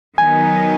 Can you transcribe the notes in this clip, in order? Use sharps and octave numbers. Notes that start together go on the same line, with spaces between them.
D#3 F#3 B3 D#4 G#5